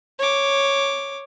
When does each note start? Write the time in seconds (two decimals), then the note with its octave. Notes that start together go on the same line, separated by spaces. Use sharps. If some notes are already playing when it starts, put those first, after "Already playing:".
0.19 C#5 D6